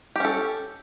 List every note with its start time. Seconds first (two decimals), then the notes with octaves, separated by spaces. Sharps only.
0.16 G4
0.20 C#4
0.25 A4